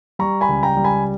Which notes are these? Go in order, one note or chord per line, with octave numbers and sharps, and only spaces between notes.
G3 A#5 C#6
G#5 B5
C#2
G5 A#5
G3
G#5 B5